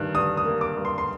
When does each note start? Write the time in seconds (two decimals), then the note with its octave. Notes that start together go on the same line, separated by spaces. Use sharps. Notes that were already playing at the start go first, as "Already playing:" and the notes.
Already playing: G2 D#3 F#6
0.15 G2 D#6
0.37 D#6
0.46 A#3
0.61 D6
0.77 G2
0.85 C6
0.98 C6